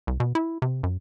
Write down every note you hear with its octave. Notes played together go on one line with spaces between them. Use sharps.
C2
B2
E4
C3
F#2